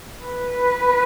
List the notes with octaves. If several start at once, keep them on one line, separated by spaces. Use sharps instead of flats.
B4